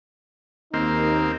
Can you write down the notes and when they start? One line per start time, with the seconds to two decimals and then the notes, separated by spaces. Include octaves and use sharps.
0.74 D#2 A#3 C4 D#4